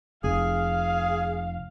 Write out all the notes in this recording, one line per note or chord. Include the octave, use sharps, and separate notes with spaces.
F1 G#4 F5